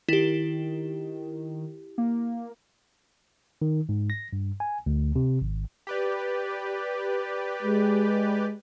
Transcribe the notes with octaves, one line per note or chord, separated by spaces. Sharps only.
D#3 E4 G4
A#3
D#3
G#2
A#6
G2
G#5
D2
C3
G#1
G4 B4 D5
G#3